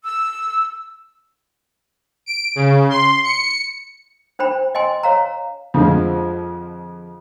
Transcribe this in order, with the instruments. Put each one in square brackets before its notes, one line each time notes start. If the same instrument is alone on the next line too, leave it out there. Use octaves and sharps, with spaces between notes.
[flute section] E6
[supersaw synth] D7
C#3
C6
C#7
[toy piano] D4 C5 G5 B5
D#5 G5 G#5 C6
C#5 F5 A#5
[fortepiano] F2 D3 F3 G#3